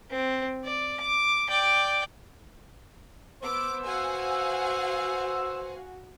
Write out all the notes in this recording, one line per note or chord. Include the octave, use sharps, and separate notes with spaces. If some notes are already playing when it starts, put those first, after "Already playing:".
C4
D5
D6
D5 G5
B3 B4 C5 D6 E6
F#4 F5 F#5 G#5